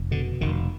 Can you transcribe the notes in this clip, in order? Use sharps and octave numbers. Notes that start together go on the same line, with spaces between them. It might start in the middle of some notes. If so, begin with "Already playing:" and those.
Already playing: F1
B2 D3
F1 D#3